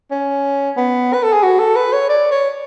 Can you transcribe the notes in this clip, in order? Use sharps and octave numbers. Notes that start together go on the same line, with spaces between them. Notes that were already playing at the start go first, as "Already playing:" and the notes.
C#4
B3
B4
A4
G#4
F#4
A4
B4
C#5
D5
C#5